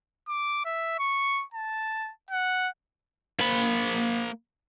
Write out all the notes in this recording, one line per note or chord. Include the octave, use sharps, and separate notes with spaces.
D6
E5
C#6
A5
F#5
A#3 B5